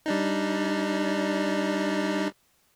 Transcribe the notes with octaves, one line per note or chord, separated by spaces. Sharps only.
G3 D4 D#4